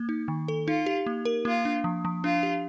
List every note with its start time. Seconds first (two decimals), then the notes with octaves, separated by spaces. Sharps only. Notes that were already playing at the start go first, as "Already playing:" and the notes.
Already playing: A#3
0.09 D#4
0.28 D#3
0.48 A4
0.67 D#4 F4
0.86 G4
1.06 A#3
1.25 A#4
1.45 A#3 F4
1.65 D4
1.84 F3
2.05 F3
2.24 D4 F4
2.43 G4